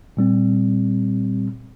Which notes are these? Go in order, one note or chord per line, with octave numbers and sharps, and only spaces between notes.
A#2 G3 C4